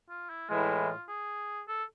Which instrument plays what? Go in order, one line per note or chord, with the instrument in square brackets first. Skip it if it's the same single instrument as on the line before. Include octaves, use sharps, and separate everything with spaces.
[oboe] F4
E4
[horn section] A2 E3 G#3 [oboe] F4
[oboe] G#4
A4